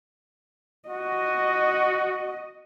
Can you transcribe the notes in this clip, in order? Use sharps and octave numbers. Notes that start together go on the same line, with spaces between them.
F#4 D#5